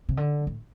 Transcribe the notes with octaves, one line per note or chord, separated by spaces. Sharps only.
C3
D3
A2